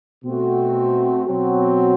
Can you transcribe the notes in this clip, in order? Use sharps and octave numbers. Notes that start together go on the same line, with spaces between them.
B2 A3 C4 F#4
B2 F#3 C4 F#4